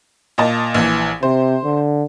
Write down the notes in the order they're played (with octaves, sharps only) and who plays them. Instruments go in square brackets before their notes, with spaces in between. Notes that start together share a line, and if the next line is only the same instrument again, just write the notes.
[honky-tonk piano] A#2 D#5 A5
A#1 E3
[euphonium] C3 [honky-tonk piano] C5
[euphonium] D3